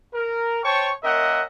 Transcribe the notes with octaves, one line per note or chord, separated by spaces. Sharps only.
A#4
C5 C#5 G5 A5 C#6
A#3 C#4 A#4 D#5 E5 F#5